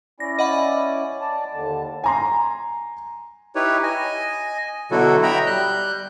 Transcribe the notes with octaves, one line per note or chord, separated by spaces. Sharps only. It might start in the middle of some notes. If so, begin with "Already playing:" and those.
C#4 E4 D5 A#6
D#5 F#5 B5
D5 A5
D#2 D3 A5
G#5 A#5 C6
D#4 E4 G4 B4 C#5
D#5 G#5
B2 D3 F#3 E4 F#4 A4
D#5 E5 G5 A#5 B5
G3 F#6 G6